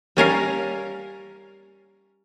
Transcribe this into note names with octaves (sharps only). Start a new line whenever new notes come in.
G3 C#4 A#4 F5